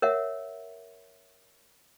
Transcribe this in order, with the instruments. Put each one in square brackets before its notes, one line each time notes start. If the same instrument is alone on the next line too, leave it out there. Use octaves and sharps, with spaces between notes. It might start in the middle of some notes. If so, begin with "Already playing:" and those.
[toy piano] A#4 C#5 E5 F#5